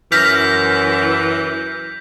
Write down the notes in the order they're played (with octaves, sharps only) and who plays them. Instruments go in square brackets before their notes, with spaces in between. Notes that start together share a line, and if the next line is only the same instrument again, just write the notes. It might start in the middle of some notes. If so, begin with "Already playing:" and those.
[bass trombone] F#2 [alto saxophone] E3 [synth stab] F6 A#6 [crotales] G6 B6